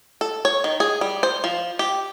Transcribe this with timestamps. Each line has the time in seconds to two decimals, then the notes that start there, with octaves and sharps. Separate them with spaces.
0.21 A4
0.45 C#5
0.64 D#3
0.80 G#4
1.01 G3
1.23 C5
1.44 F3
1.79 G4